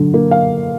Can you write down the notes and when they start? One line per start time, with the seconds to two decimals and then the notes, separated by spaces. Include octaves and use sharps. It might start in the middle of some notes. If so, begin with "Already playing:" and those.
Already playing: D3 F#3
0.14 A#3
0.31 F5